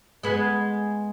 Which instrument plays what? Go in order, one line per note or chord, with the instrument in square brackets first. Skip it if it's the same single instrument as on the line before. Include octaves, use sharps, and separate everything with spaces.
[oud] G#3 B3